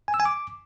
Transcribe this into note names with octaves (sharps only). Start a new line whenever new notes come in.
G#5
E6
G#5
D6